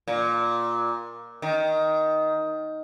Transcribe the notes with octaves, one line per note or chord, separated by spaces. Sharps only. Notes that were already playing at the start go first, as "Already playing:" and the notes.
A#2
D#3